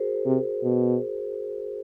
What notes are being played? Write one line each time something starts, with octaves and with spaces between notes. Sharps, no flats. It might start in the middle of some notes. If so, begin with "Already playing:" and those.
Already playing: F#4 G#4 A#4 C5
C3
B2